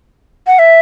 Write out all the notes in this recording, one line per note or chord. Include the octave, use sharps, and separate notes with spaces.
F#5
E5